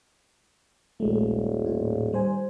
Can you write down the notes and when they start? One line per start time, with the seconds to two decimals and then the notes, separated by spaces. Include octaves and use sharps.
1.00 D#1 A#1 G#3 A3
1.65 A2 F4
2.13 G3 C5 G#5